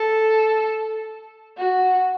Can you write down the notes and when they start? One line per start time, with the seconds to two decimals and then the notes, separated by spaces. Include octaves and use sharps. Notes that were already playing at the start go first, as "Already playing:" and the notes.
Already playing: A4
1.57 F#4